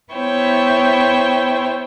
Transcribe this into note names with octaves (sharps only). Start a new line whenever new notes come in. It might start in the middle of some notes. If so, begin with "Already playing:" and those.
B3 E4 C5 C#5 G5